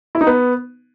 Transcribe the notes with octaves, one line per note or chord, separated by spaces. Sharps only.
E4
D#4
B3